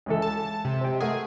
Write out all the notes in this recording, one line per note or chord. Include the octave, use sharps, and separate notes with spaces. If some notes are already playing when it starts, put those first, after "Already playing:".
C#2 E3 A4
A5
C3
C5 G5
A3 G#4 A#4 F#5